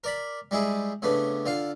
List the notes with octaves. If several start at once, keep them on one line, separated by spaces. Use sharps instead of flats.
A#4 D5 B5
G3 G#3 E4 G#4
A2 C#3 B3 D4
D3 F4 F5